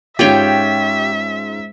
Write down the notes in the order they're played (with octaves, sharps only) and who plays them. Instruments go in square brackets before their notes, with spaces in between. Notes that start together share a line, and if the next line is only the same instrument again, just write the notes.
[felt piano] G#2 C#4 [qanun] F4 C#5 G5 [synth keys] G4 [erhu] E5